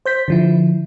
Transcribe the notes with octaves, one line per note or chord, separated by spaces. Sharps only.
C5 G6 B6
D3 F3 E4